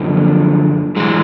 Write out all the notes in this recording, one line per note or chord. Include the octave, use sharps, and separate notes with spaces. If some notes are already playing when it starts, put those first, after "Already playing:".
Already playing: F#2 D3 F3
G#2 E3 G#3